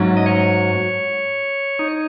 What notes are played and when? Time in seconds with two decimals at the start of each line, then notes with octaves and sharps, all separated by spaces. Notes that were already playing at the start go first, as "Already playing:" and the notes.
Already playing: G#2 F#3 A3 C#4
0.17 D#5
0.26 C#5
1.79 D#4